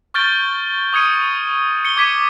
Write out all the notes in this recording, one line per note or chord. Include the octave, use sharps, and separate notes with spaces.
C#6 F6 G6 A6 D7 G7
C#6 D#6 G#6 C#7 D#7
C#7 G7
D6 G#6 B6 C#7 D#7